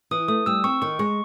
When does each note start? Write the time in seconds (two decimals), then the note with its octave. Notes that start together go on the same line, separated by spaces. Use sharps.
0.11 E3 D#6
0.28 A3 D#6
0.46 G3 E6
0.64 C4 C#6
0.82 D#3 C#6
0.99 G#3 C#6